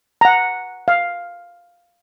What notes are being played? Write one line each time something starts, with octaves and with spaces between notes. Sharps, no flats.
F#5 A#5
F5